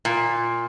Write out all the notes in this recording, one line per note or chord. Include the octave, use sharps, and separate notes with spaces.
A#2